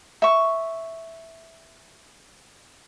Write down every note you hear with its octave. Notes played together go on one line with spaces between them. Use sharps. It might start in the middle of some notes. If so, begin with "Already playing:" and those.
E5 C#6